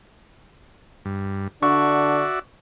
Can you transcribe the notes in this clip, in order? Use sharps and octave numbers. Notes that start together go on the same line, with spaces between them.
G2
D3 D4 F#4 D5 E5 C#6